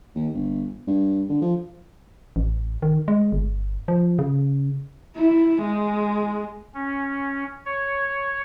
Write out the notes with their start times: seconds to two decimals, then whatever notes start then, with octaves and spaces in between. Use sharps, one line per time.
0.15 D#2
0.34 G1
0.87 G2
1.30 D3
1.42 F3
2.36 A1
2.82 D#3
3.08 G#3
3.32 G1
3.88 F3
4.19 C#3
5.16 E4
5.62 G#3
6.74 C#4
7.66 C#5